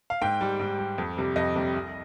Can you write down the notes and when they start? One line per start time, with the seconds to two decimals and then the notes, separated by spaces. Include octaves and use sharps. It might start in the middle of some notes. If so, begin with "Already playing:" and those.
0.10 F5
0.22 G#2 G5
0.41 G3
0.59 G#2
0.79 G3
0.98 F2
1.17 C3 G3
1.36 F2 D#5
1.56 C3 G3
1.74 C2